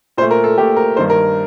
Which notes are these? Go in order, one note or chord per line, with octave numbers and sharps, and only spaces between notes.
A#2 A3 C5
A#4
A4
A#2 A3 G4
A#4
G2 D#3 A#3 C5
A#4